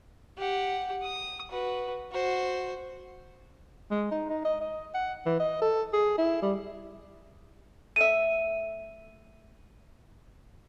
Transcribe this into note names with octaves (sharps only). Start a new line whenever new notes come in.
G4 F#5
D#6
F#4 B4
F#4 C5
G#3
D#4
D#4
D#5
D#5
F#5
E3
D#5
A4
G#4
E4
G3
A3 E5 D#7